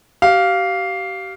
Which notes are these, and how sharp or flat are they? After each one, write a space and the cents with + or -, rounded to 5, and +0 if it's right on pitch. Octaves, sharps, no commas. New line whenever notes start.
G4 -35 F5 +0